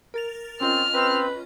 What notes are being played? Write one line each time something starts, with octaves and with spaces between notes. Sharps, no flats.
A#4 A6 F7
C4 C#4 F4 D#5 F6
C4 B4